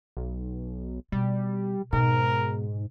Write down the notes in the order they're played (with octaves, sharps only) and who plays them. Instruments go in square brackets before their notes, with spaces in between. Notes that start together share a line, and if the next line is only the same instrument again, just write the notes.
[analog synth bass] B1
[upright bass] B2 [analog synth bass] G3
[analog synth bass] G#2 [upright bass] B2 [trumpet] A#4